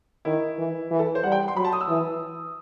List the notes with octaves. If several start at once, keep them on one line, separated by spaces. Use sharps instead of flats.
D#3 E4
E3
E3
A4
C5
G3 F#5
G5
C6
F#3 B5
A5
D#6
E6
E3